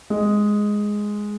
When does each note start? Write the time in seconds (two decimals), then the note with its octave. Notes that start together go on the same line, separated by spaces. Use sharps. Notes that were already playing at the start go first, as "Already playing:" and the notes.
0.10 G#3